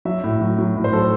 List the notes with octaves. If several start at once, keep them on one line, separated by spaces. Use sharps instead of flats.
F#3 E5
A2
F#3
F#3
A2
C5
F#3 A4